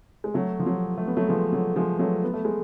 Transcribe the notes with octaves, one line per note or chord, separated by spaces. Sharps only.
G#3
F#3 A3
F3
F#3
A3
B3
F#3 A3
F3 G#3
F#3
F3 G#3
F#3 A3
B3
A3
G#3